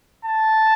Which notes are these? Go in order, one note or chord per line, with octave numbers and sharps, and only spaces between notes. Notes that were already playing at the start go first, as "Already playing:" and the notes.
A5